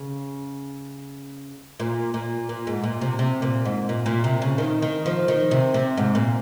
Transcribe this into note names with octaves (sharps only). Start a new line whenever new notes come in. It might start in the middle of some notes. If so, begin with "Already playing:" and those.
Already playing: C#3
A#2
A#2
A#2
G#2
A#2
C3
C3
A#2
G#2
A#2
A#2
C3
C#3
D#3
D#3
F3
D#3
C3
C3
G#2
A#2